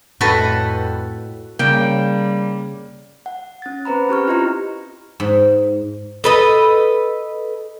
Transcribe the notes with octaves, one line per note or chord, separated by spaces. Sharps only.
F2 A2 F#4 A4 B4
C#3 G3 A#3 G5
F#5
C#4 A6
C4 B4 C5 A#5 B5
C#4 G4 C#6 F6
E4 F4 G4 D#5 A#5 C6
G#2
A4 B4 D#5